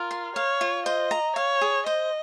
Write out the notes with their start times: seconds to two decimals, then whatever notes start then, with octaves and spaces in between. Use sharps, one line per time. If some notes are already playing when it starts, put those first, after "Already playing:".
Already playing: F4 A#4
0.11 C6
0.36 C#5 F5
0.61 F4
0.86 C5 D#5
1.11 A#5
1.36 C#5 F5
1.61 G#4
1.86 C5 D#5